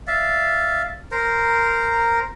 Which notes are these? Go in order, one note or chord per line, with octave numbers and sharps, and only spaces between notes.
D5 E5 F5
A#4 C5 A#5